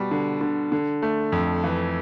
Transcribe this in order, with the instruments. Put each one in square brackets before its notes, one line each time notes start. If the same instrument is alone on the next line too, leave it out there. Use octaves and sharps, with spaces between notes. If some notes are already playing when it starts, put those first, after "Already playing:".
Already playing: [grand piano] B2 G3
D3
D3
D3
A3
F2
E3